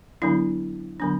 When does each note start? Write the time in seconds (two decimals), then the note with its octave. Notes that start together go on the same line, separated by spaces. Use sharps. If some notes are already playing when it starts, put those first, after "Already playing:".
0.22 D3 F#3 B3 D4 E4
1.00 D3 F#3 B3 D4